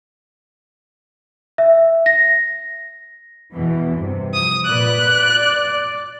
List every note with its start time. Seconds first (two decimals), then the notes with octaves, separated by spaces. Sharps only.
1.58 E5
2.06 A#6
3.53 E2 B2 E3
3.96 G2 C3
4.34 F3 D#6
4.66 A#2 B4 D5 F#6
5.10 D5